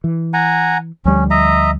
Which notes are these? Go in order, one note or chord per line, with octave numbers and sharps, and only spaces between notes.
E3
F#5 G#5 A#5
D2 F3 G3 C#4
D#5 E5 A#5